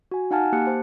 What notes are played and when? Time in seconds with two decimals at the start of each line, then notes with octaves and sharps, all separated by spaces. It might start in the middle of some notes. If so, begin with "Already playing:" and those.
0.11 F#4 G#5
0.31 D#4 F5 F#5 G#5 A5 F6
0.52 A#3 G4 F#6 C#7
0.66 C5 A5